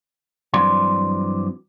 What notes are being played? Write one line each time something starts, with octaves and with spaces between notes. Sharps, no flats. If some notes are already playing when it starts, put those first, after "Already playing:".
G2 E3 F#3 C4 D5 C6